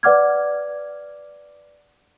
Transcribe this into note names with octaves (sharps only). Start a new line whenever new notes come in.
B4 D5 F#5 D6 F6 G#6